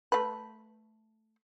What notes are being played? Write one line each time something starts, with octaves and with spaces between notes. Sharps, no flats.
A3 B4